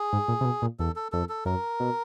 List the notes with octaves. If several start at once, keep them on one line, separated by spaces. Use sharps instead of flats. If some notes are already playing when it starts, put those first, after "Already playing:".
Already playing: G#4
G#2
A#2
C3
B2
A#2
E2 A4
A4
F2 A4
A4
F#2 A#4
B2